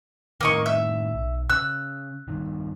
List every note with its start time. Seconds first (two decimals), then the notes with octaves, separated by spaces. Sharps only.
0.41 A2 D#3 A#3 D#5 C#6
0.66 E5 E6
1.14 B1
1.50 C#3 E6 F#6
2.28 G2 D#3